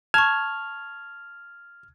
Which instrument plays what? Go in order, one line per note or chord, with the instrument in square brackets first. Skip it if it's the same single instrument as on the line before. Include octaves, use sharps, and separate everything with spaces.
[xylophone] A5 C#6 [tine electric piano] F6 [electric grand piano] G#6